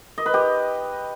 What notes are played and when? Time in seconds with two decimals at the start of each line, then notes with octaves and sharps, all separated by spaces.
0.18 D#5
0.26 B4
0.34 G4